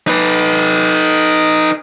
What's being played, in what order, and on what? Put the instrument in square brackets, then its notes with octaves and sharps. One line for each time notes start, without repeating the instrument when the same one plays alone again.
[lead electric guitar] D#4 B4